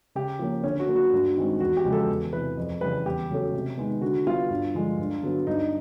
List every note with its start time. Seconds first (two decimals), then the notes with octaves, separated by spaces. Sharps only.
0.15 C#3 G4
0.39 F3 A#3 C#4
0.64 D3 C#4
0.80 F#4
0.88 F#3 A#3 C#4
0.96 F#4
1.13 G2
1.37 D#3 G#3 C4
1.60 E2 F#4
1.77 G4
1.85 C#3 F3 G#3
1.93 A4
2.09 E2
2.33 C3 E3 B4
2.57 F2
2.81 C#3 E3 G3 B4
3.05 E2 G4
3.30 C#3 F#3 A3 C#4
3.54 C3
3.78 D#3 G#3 B3
4.02 D3 F#4
4.26 G3 B3 F4
4.50 G2
4.75 D3 F3 G#3
4.99 G2
5.23 D3 F#3 B3
5.47 G2 D#4